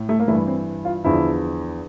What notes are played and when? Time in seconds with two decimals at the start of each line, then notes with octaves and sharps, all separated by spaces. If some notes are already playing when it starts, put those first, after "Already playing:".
Already playing: A2
0.09 A3
0.19 A#3
0.28 G2 E3 A3
0.47 C4
0.85 F4
1.04 E2 D3 F3 E4